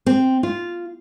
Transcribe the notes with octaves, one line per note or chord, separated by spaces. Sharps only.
C4
F4